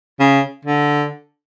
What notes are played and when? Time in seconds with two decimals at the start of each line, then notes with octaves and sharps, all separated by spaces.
0.20 C#3
0.65 D3